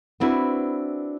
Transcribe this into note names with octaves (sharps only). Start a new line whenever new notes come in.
B3 C4 D4 E4 F#4 B4